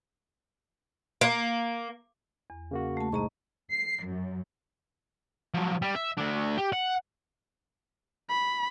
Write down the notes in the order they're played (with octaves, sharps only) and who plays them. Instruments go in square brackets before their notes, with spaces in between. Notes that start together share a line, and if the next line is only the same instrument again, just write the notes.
[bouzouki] A#3
[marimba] E2
[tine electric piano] C#3 A#3 F#4
[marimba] A3 A5
[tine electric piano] C2 G#2 G#3 [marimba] D#5 A#5 C#6
[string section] C7
F#2
[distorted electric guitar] F3 F#3
G3
E5
A3 D4
G4
F#5
[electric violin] B5